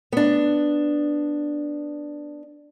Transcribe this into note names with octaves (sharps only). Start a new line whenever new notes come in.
B3 D4